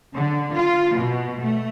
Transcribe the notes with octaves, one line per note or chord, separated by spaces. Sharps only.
D3
F4
B2
A3